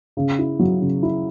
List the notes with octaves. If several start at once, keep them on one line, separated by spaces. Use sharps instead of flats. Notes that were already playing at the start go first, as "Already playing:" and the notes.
C#3
E4
F#3
C#3
E4